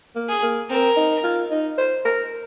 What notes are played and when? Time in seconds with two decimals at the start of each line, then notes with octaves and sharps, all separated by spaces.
0.15 A#3
0.29 G#4
0.42 A#3
0.70 C4 A#4
0.96 D#4
1.23 F4
1.51 D#4
1.78 C5
2.05 A#4